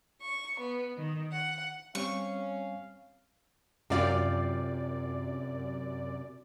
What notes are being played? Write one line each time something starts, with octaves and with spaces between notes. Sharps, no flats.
C#6
B3
D#3
F#5
G3 C4 C#4 F5 C#6
F#2 C3 F4 D5